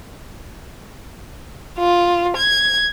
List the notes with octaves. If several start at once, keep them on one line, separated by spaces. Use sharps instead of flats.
F4
G#6